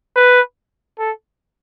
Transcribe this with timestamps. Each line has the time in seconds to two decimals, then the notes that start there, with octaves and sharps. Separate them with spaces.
0.16 B4
0.99 A4